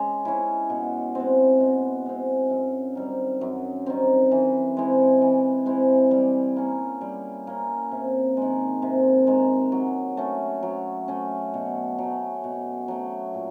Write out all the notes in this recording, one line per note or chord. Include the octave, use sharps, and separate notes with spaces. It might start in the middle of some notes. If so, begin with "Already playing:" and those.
Already playing: G#3 C#4
C#4 E4
B2
G#3 C4
B2
G#3 C4
F#2
D#3 G3 C4
F#2
D#3 G3 C4
E3
G#3 C4 E4
E3
G#3 C4 E4
G3
A#3 C#4
G3
A#3 C#4
C3
D#3 G#3
C3
D#3 G#3
F#3
A3 C#4
F#3
A3 C#4
B2
F#3 A3
B2
F#3 A3
A#2